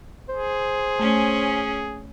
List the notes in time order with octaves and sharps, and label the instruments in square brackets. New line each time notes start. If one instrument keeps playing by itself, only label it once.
[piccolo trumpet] G#4 [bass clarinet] C5
[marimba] A3 [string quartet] C#4